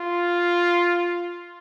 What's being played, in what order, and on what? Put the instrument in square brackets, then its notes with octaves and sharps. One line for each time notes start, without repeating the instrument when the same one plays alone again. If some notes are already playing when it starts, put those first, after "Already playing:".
Already playing: [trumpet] F4